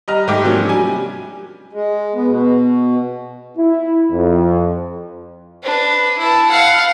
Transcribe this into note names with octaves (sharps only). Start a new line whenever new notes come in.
G3 D#5 A#5 F6
G#2 A3 G4 D6
C3 F3 F#3 A#3 C#4 D4
G3 G#5
G#3
B3
B2
E4
F2
D4 B4
E4 A5
F5 F#5